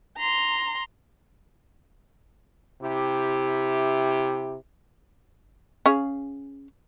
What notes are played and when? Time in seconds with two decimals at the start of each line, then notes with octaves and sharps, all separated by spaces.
0.17 A#5 C6
2.82 C3 E4 G4
5.86 C#4 G#4 F5